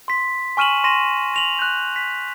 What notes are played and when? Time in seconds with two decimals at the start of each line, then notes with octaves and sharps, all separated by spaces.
0.08 C6 B6
0.57 G#5 C#6 F6 D#7 E7 F#7
0.84 C6 C#6 A#6 D#7 E7 F#7
1.34 A#6 F7 F#7
1.59 F#6 G6
1.96 B6